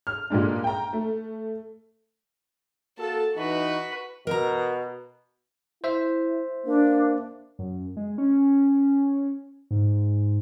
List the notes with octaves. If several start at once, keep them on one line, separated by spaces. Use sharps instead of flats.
F6
A#2 G3 G#3 D4
G5 A#5
A3
A#3 F#4 A4 A5
E3 D#4 F#4 B4
B2 A#4 A#5
E4 C5 E5
A#3 D4
F#2
G#3
C#4
G#2